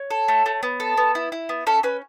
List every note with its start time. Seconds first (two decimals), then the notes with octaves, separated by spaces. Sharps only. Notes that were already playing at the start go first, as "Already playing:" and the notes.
Already playing: C#5
0.11 A4
0.28 A3
0.46 A3
0.63 B3
0.80 A4
0.97 B3
1.15 E4
1.32 E4
1.49 B3
1.67 C#4 A4
1.83 C#4 B4